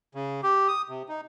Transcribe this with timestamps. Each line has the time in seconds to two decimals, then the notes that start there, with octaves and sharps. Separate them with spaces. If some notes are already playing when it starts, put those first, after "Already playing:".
0.15 C#3
0.43 G4
0.68 D#6
0.89 C3
1.09 D#4